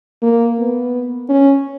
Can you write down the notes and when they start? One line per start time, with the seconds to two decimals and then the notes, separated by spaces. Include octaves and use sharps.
0.23 A#3
0.59 B3
1.29 C#4